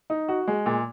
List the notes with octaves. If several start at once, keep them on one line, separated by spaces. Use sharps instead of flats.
D#4
F#4
G#3
A#2